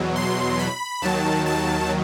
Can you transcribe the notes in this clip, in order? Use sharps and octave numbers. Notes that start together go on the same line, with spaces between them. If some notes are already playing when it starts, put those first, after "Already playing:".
Already playing: E2 B2 F#3
C6
B5
D#2 D#3 F#3 A5
A5